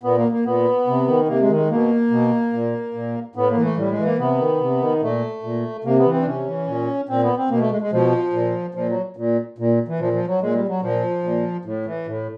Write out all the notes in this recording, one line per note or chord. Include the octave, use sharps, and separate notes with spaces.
A#2 B3
A#3
A#3
A#2 B3
C3
D#3
C3 A#3
G#3
D#3
G#3
B2 A#3
B2
A#2
A#2
A2 B3
A#3
E3
A3
A2 G3
G#3
E3
A#3
C3 B3
D#3
C3
D#3
A#2 A3
A#2
C3 A#3
B3
E3
C4
D4
C3 C#4
E3
A#2
A#2 C4
B3
C4
B2 A#3
A3
G#3
G#3
B2 F3
A#2
A#2 F3
F#3
A#2
A#2
E3
A#2 F3
F3
F#3
A#2 G#3
G3
F#3
A#2 F3
A#2
A2
E3
A2